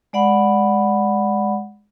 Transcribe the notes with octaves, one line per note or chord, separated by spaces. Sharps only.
G#3 D5 F#5 B5